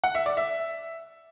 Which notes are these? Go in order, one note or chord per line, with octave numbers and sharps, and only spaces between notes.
F#5
E5
D5
E5